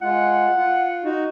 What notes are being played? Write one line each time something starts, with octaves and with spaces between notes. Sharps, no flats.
G#3 F4 F#5
F4
D#4 F#4